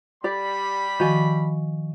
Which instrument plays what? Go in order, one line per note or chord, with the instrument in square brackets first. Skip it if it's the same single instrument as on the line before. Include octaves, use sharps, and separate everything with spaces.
[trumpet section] G3 B5 [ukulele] G4 D5
[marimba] D#3 F3 [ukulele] F#4 G#5